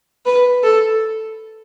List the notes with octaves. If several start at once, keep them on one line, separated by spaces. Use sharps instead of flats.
B4
A4